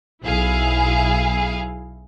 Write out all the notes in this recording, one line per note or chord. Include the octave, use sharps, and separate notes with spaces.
B1 E4 G#4 F5